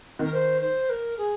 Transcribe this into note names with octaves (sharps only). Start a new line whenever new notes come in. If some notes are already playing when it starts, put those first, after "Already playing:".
D#3 A#4
C5
C5
A#4
G#4